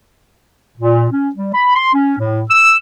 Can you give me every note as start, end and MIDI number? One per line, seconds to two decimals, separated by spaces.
0.77 1.04 46
1.10 1.29 61
1.35 1.51 55
1.53 1.74 83
1.75 1.90 84
1.93 2.13 61
2.18 2.43 45
2.50 2.75 88